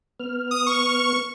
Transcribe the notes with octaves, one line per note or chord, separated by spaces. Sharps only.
B3 F6
D#6
C#6